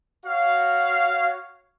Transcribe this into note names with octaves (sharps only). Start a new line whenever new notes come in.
F#4 C#5 F5